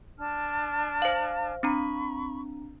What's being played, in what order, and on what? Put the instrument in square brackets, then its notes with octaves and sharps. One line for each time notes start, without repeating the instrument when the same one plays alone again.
[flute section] D4 A5 F6
[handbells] C5 F5
[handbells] C4 D4 A#5 [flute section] B5 C#6